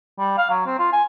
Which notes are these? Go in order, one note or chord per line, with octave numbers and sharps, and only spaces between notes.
G3
F5
F#3
C4
F4
G#5